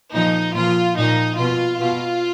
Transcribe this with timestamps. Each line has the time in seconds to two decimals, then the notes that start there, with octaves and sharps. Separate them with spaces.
0.13 A#2 F3 D#4
0.55 A#2 F3 F4
0.97 A#2 F3 D#4
1.38 B2 F4
1.80 B2 F4